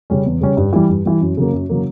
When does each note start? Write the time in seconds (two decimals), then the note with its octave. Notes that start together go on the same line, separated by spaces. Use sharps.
0.10 C#3 G3 C#4
0.26 E2
0.41 C#3 G3 C#4
0.57 G2
0.73 E3 G3
0.89 G2
1.06 E3 G3
1.21 F#2
1.37 C#3 F#3 A#3
1.53 F#2
1.69 C#3 F#3 A#3